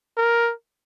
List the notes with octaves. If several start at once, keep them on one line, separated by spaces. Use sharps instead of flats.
A#4